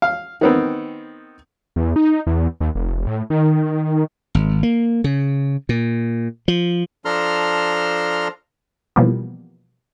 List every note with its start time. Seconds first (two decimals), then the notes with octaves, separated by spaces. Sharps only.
0.02 F5
0.41 D#3 B3 C4
1.76 E2
1.96 D#4
2.27 E2
2.61 D#2
2.75 F1
3.07 A2
3.30 D#3
4.35 G#1
4.63 A#3
5.04 C#3
5.69 A#2
6.48 F3
7.05 F3 D4 A4 A#5 C6 F6
8.96 B2 E3 F3 G3 A#3 B3